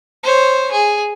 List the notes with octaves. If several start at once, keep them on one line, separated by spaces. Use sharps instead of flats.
C5 C#5
G#4